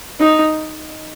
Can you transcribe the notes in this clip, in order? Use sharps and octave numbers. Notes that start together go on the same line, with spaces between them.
D#4